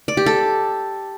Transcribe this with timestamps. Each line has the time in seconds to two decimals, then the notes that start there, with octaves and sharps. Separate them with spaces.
0.08 D5
0.17 G4
0.26 A4